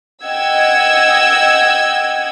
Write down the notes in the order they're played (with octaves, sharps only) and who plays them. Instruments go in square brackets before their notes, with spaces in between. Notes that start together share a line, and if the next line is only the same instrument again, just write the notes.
[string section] D#5 F#5 G5 E6 G#6